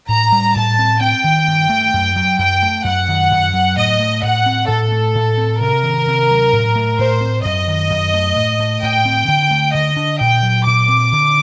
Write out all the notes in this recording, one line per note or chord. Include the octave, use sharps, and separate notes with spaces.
A2 A#5
G3
A2 A5
C4
C4 G5
D#3
G2
A3
F#2
F#3
F#2 G5
A3
F#2 F#5
D#3
F#2
F#3
A2 D#5
A3
A2 F#5
C4
A2 A4
A3
A2
C4
C3 A#4
D#3
C3
F#3
A2
A3
A2 C5
C4
F#2 D#5
D#3
F#2
A3
A2
A3
A2 G5
C4
D3
A3
D3 D#5
D4
A#2 G5
F#3
A#2 D6
C4
D3